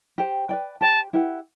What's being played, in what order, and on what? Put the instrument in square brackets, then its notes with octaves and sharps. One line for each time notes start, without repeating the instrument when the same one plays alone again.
[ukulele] G4 C5 G5
B4 D5 G5
[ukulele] G4 C5 G5 [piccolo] A5
[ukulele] E4 G4 B4 F#5